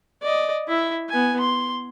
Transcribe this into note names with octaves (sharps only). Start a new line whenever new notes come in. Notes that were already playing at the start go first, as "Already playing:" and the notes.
D5 D#5
E4 E5
B3 G#5
C6